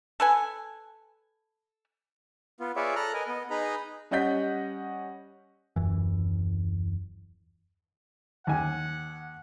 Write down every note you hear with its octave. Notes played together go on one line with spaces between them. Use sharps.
A4 B4 G#5
B3 F4
F4 G#4 B4 C#5 D5 E5
A4 A#5 F6 F#6
A#4 B4 D#5 G#5
B3 D#5
D#4 G#4 B4 D#5 A#5 B5
G3 C#4 D#5 F#5 G6 B6
D#1 F#2 E3
D#2 F#5 G#5